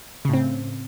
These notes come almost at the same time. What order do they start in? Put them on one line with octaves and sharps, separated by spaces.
C#3 A2 C4